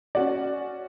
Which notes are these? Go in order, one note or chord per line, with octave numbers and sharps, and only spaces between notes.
C#4 F#4 D5